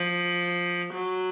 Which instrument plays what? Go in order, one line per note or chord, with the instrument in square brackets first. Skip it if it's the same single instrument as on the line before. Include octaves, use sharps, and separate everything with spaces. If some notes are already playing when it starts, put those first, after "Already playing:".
Already playing: [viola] F3
F#3